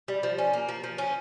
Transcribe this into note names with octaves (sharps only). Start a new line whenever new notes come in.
G3
F3
C#4
A#3
F3
F3
C#4